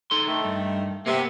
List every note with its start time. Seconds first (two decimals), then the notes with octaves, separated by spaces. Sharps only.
0.11 D#4 A4 C6
0.27 D#3 A3
0.45 G2
1.06 C3 A#3 B3